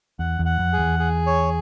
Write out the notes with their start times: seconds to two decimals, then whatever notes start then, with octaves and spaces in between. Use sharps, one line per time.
0.19 E2 F#5
0.39 E2
0.45 F#5
0.59 F2
0.73 G#4
0.79 E2
0.99 G#4
1.26 C#5